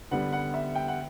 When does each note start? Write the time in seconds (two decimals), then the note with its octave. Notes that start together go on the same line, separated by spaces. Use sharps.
0.11 D3 G3 B3 F#5
0.33 F#5
0.54 E5
0.75 G5
0.88 F#5